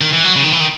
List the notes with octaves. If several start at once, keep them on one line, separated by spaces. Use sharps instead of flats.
D#3
E3
F#3
C#3
D#3
E3
D#3